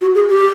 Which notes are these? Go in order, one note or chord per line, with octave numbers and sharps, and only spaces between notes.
F#4
G#4
G4